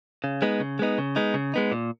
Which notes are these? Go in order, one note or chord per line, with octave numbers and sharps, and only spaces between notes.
C#3
G#3 B3 D#4
C#3
G#3 B3 D#4
C#3
G#3 B3 D#4
C#3
G#3 B3 D#4
A#2